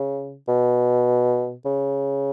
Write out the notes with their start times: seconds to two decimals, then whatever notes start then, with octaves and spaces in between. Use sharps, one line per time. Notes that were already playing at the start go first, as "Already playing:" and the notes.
Already playing: C#3
0.48 B2
1.65 C#3